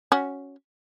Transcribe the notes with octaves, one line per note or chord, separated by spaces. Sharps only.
C#4 F#4